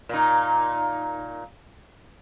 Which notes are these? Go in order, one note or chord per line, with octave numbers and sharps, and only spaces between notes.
A#2 D#4